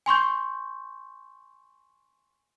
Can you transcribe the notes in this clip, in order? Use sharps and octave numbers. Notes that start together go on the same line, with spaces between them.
G#5 C6 C#6 G6